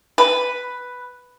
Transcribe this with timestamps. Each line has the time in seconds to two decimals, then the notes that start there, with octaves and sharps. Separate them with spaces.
0.18 B4